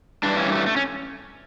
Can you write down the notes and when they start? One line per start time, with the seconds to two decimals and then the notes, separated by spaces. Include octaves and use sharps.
0.23 G2 E3 G3 D4
0.37 C#4
0.52 A3
0.66 A3
0.76 C#4